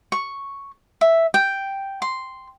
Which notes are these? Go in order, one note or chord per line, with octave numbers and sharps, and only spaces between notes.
C#6
E5
G5
C6